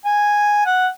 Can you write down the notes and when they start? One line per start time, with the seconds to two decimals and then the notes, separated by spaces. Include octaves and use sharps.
0.05 G#5
0.66 F#5